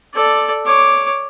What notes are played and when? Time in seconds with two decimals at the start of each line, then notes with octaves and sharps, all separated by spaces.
0.14 A4 D5
0.66 C#5 D6